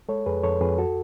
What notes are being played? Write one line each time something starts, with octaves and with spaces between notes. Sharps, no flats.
G#3 A4 C#5
F2 G#4 B4
F2 A4 C#5
F2 G#4 B4
F#4 A4